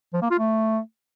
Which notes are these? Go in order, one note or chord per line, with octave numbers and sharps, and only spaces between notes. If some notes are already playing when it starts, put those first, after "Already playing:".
F3
A#3
F4
A3